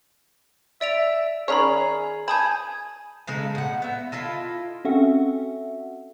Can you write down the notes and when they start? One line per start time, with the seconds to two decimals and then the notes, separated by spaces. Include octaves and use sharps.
0.81 D5 E5 D7 F7
1.48 D#3 C#4 G#4 C#5 D5 A#5 B5
2.28 G#5 A5 B5 D#6 G6
3.27 C#3 G#3 D#4 A4
3.55 A2 F#5
3.82 B3 E5
4.12 E4 F4 A4 D#5
4.85 C4 C#4 F#4 A4 E5 F#5